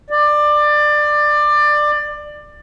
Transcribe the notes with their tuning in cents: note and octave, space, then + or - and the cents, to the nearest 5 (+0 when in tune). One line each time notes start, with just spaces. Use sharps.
D5 +20